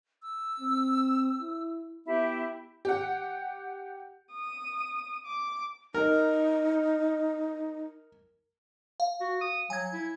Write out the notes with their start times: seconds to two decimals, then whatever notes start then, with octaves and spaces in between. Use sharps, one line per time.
0.22 E6
0.60 C4
1.41 E4
2.07 B3 E4 G4 E5
2.85 G4 F#5
4.33 D#6
5.26 D6
5.94 D#4 A#4
9.00 F5
9.20 F#4
9.41 D#6
9.70 F#3 G#5 G#6
9.93 E4